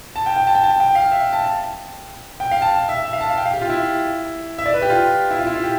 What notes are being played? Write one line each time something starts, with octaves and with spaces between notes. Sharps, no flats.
A5
G5
G5
A5
G5
A5
G5
F5
E5
A5
A5
G5
F5
A5
E5
E5
F5
A5
F5
G5
F5
G4
F4
E4
E5
D5
B4
G4
F4
E4
F4
E4
F4
G4